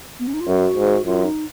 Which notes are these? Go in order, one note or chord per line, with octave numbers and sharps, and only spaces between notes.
B3
C#4
D#4
F4
F#2 F#4
G#2
F#2 F4
D#4